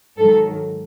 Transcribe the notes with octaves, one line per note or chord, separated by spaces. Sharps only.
G#2 D#3 F#3 A4